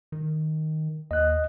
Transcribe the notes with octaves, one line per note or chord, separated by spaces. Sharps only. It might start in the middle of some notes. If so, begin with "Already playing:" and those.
D#3
D#2 D#5 F#6